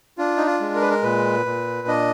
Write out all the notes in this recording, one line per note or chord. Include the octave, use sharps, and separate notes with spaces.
D4 F4
D#4
F4
G#3
A#4
B4
A#4
A#2 B4
A#2
D4 D#5